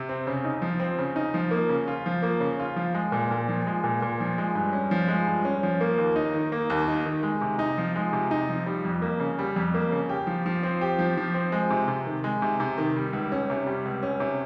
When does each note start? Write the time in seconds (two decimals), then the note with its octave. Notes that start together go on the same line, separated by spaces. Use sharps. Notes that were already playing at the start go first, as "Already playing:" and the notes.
Already playing: C3
0.09 C4
0.27 C#3
0.45 D#4
0.62 F3
0.80 C4
0.98 C#3
1.16 D#4
1.34 F3
1.51 A#3
1.69 C#3
1.87 F4
2.06 F3
2.22 A#3
2.40 C#3
2.59 F4
2.76 F3
2.94 G#3
3.12 A#2
3.31 A#2
3.49 F3
3.67 G#3
3.84 A#2
4.02 A#2
4.20 F3
4.38 G#3
4.55 G2
4.73 C#4
4.91 F3
5.08 G#3
5.27 G2
5.45 C#4
5.63 F3
5.81 A#3
5.98 D#2
6.16 D#4
6.34 D#3
6.52 A#3
6.70 D#2
6.88 D#4
7.06 D#3
7.23 G#3
7.41 C3
7.59 D#4
7.78 F3
7.96 G#3
8.13 C3
8.31 D#4
8.49 F3
8.66 G3
8.85 F2
9.02 A#3
9.20 C#3
9.39 G3
9.56 F2
9.74 A#3
9.92 C#3
10.09 G4
10.27 F3
10.46 F3
10.63 C4
10.81 G4
10.99 F3
11.17 F3
11.34 C4
11.52 G#3
11.70 C3
11.88 C3
12.06 D#3
12.24 G#3
12.42 C3
12.60 C3
12.78 D#3
12.96 G3
13.13 C#2
13.32 C#4
13.50 C3
13.66 G3
13.85 C#2
14.03 C#4
14.20 C3